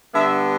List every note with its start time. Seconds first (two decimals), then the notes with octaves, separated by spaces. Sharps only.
0.13 D3 G3 B3 E5